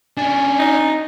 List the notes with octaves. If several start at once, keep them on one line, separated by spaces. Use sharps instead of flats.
C#4 D4 G#5
D#4